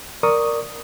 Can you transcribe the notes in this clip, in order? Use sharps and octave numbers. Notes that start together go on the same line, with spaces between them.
A#4 D5 C#6 D#6